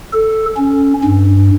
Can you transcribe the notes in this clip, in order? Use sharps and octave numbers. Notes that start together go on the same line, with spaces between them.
A4
C#4
G2